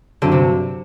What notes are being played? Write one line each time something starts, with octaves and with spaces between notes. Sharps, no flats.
G2 D3 F#3 C4 G4
C3